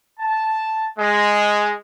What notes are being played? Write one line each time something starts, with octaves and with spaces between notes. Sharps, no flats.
A5
G#3